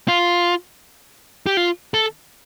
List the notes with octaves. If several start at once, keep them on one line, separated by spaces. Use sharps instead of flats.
F4
G4
F4
A4